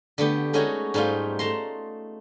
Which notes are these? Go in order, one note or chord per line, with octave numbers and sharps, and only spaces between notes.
D3 A3 B3 G4
G#3 A3 C#4 D#4 F#4 C#5
G#2 G3 A3 D#4 F4
A3 A5 A#5 C6